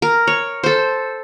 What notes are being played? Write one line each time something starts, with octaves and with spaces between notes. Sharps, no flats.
A#4
C#5
A4 C5